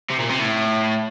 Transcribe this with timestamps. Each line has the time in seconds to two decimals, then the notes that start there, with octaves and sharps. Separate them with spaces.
0.10 C3
0.20 A#2
0.30 C3
0.40 A2